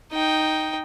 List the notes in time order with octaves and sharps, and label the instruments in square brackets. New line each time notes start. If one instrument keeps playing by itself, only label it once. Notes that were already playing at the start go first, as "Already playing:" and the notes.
[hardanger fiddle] D#4 G5